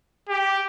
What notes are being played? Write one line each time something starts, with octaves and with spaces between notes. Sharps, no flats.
G4